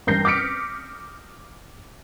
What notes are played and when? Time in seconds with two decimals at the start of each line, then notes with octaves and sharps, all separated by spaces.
0.07 A1 G2 A#4 G6 A#6 C7
0.25 D6 D#6 F6 B6 C#7 D7